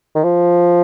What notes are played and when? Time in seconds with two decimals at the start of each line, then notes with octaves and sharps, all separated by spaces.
0.15 D#3
0.24 F3